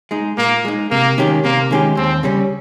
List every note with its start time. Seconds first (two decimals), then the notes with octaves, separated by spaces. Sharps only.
0.11 G#3 D#4
0.38 A#2 A#3
0.65 G#3 D#4
0.91 C3 A#3
1.18 D#3 G#3 C#4 G4
1.44 C3 A#3
1.71 D#3 G#3 C#4 G4
1.97 D#2 C4
2.23 C#3 G3 C#4